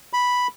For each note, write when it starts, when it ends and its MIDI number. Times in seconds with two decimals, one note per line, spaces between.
0.13 0.47 83